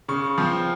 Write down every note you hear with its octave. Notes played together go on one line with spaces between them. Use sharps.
C#3 C#6
F3 C4